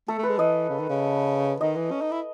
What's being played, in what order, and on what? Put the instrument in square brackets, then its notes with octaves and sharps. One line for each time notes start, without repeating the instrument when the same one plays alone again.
[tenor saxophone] A3 [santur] A4
[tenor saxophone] A3
[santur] B4
[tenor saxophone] G#3
[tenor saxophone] E3 [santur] D#5
[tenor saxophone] C#3
D#3
C#3
[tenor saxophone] D#3 [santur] D#5
[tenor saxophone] E3
C#4
D#4
E4